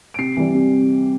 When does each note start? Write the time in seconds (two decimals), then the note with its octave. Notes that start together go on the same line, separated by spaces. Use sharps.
0.14 D7
0.18 C3 C7
0.37 E3 G3
0.54 C3